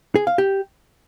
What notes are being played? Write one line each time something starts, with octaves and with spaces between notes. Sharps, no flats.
G#4
F5
G4